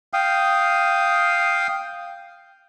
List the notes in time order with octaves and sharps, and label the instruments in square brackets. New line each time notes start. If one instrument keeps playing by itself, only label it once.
[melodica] F5 G5 D#6